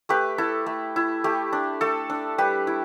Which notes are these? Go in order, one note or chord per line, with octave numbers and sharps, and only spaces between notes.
A3 G4 B4
E4 A4
A3
E4
A3 G4
D4
A3 A4
D4
G3 G4 B4
E4